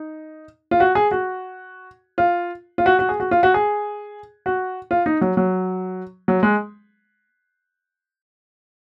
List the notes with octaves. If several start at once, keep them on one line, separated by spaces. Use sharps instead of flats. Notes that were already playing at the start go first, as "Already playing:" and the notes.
Already playing: D#4
F4
F#4
G#4
F#4
F4
F4
F#4
F#4
G#4
F#4
F4
F#4
G#4
F#4
F4
D#4
F#3
F#3
F#3
G#3